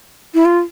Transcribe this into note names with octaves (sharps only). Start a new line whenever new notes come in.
E4
F4